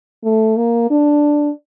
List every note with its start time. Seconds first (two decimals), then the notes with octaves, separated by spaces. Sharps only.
0.24 A3
0.57 A#3
0.91 D4